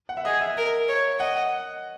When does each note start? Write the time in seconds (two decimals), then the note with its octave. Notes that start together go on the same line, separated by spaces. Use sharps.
0.09 F#5
0.17 E5
0.25 G#4 D#5
0.41 E5
0.57 A#4
0.89 C#5
1.19 D#5 F#5